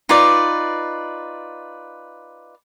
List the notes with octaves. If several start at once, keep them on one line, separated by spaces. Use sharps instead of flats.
D#4 F4 B4 D5